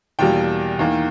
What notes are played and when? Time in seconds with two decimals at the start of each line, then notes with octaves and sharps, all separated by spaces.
0.19 E2 B2 G3 A#3 G5
0.79 E2 D#3 A#3